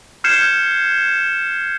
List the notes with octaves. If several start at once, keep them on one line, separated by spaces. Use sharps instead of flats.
F6 G6 G#6 C7 C#7 E7